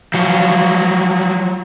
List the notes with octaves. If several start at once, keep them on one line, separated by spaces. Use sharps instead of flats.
F3 F#3